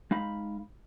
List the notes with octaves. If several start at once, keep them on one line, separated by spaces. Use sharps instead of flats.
G#3 D#4 F5 B5